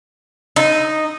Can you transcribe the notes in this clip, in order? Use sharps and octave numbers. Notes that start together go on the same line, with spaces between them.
D#4